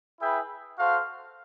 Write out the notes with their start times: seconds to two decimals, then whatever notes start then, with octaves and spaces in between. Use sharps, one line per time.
0.19 E4 G#4 B4 E5 G5
0.77 F#4 A4 C5 F5